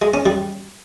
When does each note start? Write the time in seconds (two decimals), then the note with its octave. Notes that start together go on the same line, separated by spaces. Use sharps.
0.02 G#3
0.14 C#4
0.26 G3